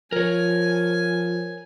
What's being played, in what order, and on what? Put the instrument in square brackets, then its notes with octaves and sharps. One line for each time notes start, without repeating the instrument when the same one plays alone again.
[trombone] F3 [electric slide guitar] A#4 C#5 [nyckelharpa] G#5